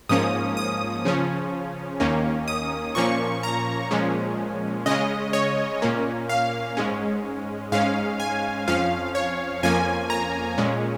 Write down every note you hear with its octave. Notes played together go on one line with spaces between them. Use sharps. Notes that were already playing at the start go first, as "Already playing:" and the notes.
G#2 F3 A#3 C#4 D#6
D#6
C#3 F3 C#4
D#2 D#3 A#3 C#4
D#6
A#2 F3 A#3 C#4 C#6
A#5
A#2 F3 G#3 C#4
C#3 G#3 C#4 D#5
C#5
A#2 A#3 C#4
F5
G#2 G#3 C#4
G#2 G#3 C#4 F5
G#5
F2 F3 C#4 F5
C#5
F2 F3 A#3 C#4 G#5
A#5
A#2 G#3 C#4